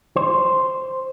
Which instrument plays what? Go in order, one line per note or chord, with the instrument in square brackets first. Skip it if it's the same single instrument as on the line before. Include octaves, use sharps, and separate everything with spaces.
[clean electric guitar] C5